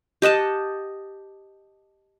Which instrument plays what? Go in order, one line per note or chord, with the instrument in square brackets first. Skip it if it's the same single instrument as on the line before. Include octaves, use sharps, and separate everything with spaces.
[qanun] G4 D#5 F#5 A5